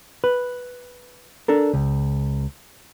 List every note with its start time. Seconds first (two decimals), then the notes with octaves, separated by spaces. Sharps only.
0.24 B4
1.48 D4 A4 A#4
1.74 C#2